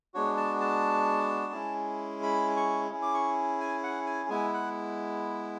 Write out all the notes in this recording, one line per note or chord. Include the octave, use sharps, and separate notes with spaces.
G#3 B3 D4 F#4 C#5
A5
A5
G#3 C#4 E4 G#4
B5
C#6
C#4 E4 G#4
D6
C#6
G#5
F#5
G#5
G#3 B3 E4 G#5
F#5